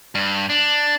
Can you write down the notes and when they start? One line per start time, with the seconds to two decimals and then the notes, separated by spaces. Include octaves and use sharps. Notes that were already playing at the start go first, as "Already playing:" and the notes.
0.15 G2
0.50 D4